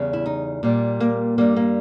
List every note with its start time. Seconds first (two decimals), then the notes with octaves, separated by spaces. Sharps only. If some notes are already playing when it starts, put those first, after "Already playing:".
Already playing: E2 C#3 G3
0.13 E4
0.26 D#4
0.63 A#2 G3
1.00 A#3
1.38 G2 G3 A#3
1.57 A#3